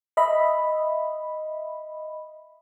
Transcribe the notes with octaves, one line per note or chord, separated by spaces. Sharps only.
D#5 E5 B5